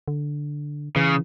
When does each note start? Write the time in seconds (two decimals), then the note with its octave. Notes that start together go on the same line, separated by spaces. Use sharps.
0.08 D3
0.96 C#3 E3